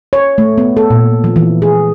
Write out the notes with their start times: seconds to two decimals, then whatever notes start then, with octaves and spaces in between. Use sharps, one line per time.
0.13 C#5
0.38 A3
0.58 B3
0.77 A4
0.90 A#2
1.24 F3
1.36 E3
1.62 G#4